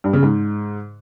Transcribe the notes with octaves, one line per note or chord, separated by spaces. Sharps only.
G2
C#3
G#2